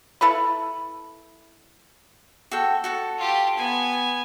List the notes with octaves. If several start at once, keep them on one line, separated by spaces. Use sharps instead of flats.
E4 A4 B4 B5
F#4 A4 G5
F#4 A4 A5
F4 G4
B3 G#5